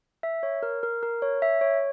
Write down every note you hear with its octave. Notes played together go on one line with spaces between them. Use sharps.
E5
C#5
A#4
A#4
A#4
C#5
E5
C#5